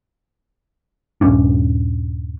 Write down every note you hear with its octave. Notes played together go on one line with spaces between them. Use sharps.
D#1 G2 C#4 D4